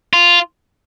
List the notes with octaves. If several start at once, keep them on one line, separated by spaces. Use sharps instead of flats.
F4